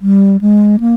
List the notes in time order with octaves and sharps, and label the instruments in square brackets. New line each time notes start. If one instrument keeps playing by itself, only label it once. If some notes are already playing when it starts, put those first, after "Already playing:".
[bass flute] G3
G#3
A#3